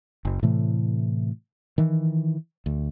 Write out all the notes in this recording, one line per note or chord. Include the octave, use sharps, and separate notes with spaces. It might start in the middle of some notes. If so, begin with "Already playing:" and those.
F#1
A2 C3 E3 A3
D#3 E3
D2